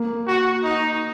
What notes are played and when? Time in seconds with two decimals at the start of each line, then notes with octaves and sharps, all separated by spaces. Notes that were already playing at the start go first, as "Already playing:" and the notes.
Already playing: A#3
0.27 F#4
0.63 D#4